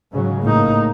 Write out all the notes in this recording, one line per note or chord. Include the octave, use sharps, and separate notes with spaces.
G#2 C#3 F#3
A2 A#3 D#4